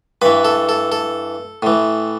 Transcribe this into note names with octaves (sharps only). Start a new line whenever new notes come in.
G2 E3 B4
A4
A4
A4
A2 E3